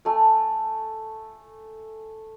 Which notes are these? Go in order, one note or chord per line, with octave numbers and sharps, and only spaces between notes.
A3 G#5